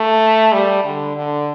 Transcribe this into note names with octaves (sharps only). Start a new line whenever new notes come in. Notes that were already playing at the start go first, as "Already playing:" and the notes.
Already playing: A3
G3
D3
D3